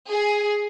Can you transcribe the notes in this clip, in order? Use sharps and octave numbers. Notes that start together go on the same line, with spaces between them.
G#4